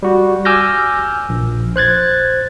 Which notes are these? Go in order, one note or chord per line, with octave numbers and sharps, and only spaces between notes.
G3 F#4
G#5 D6 E6 F6 G6 A#6
A#1
C5 F#6 G#6 A6